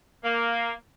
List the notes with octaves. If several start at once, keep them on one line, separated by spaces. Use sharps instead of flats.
A#3